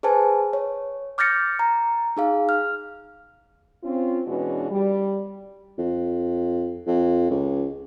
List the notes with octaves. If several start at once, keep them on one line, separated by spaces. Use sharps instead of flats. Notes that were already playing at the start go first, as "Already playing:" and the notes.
G#4 B4 C5 G#5 A5
C#5
D6 F6 G6 A6 A#6 C#7
A#5
D#4 G#4 F5
F6
C4 C#4 F4
B2 E3 G#3 C#4 D4 F#4
G3
F2
F2
C#2